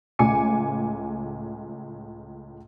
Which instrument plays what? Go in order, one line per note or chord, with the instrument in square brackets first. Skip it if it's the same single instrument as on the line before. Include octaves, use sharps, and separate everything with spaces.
[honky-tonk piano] C#2 A2 G#5 D6 C#7